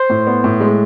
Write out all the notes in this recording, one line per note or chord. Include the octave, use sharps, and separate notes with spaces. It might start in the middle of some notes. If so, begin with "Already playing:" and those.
Already playing: C5
A2
B3
A2
G#3